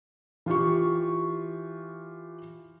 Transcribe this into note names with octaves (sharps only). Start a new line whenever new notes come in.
E3 F4 G4 C#6